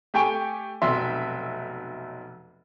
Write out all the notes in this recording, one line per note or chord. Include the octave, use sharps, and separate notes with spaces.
A3 G4 G5 G#5 C#6 D7
F1 B1 E5 C6